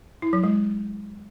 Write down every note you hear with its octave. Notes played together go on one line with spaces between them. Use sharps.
E4
F#3
G#3